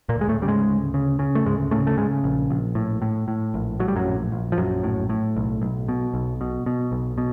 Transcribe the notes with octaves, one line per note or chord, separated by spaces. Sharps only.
A#2 A#3
D2
G#3
A2 A3
C#3 G3
G#2 G#3
D2
C#3
C#3
A3
D2 G#2 G#3
A2 C#3 A3
A3
G#2 C#3 G#3
A#1
A#1
A2
A2
A2
A#1
A2 F#3
G3
F#2 F#3
A#1
A#1
F3
A#1 F#2 F#3
A2
A2
B1
B1
B2
B1
B2
B2
B1
B2